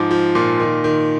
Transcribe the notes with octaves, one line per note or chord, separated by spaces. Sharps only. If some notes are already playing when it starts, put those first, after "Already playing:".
Already playing: G#2 F3 D6
F3
A#2
D#3
D#3